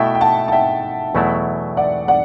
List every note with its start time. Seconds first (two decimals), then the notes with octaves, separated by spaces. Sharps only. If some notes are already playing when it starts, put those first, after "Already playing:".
Already playing: B2 A3 E4 E5 G5
0.14 G5
0.21 F#5 A5
0.48 A5
0.52 E5 G5
1.15 E2 B2 F#3 A3 E4
1.77 D5 F#5
2.08 D5 F#5